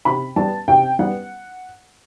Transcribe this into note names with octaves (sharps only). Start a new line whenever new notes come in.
C3 B5
G3 B3 A5
C3 G5
G3 B3 F#5